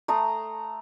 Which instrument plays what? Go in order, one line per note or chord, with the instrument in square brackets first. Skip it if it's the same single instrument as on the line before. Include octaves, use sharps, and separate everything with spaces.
[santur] A3 A#5 C6 D#6